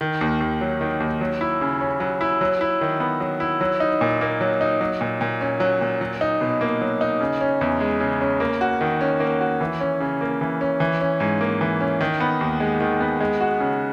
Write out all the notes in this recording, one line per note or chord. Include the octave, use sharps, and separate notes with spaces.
D#3
D#2
D#2
F#3
D#3
D#2
F#3
E4
C#3
C#4
F#3
E4
F#3
E4
D#3
B3
F#3
E4
F#3
D#4
A#2
A#3
F#3
D#4
F#3
A#2
A#2
C#4
F#3
A#2
F#3
D#4
B2
A#3
F#3
D#4
C#3
C#4
E2
G#3
C#3
C#4
A#3
F#4
D#3
C#4
A#3
F#4
E3
C#4
C#3
A#3
E3
C#4
E3
C#4
G#2
A#3
E3
C#4
D#3
B3
D#2
G#3
D#3
B3
G#3
F#4
C#3